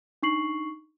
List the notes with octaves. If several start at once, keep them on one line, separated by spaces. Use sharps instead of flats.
D4 D#4 C#6 C7 F#7